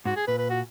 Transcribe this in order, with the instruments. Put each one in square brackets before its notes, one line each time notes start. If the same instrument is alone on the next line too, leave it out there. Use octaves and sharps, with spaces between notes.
[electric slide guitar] G#2 [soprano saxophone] F#4
[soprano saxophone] G#4
[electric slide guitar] A#2 [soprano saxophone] B4
[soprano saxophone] B4
F#4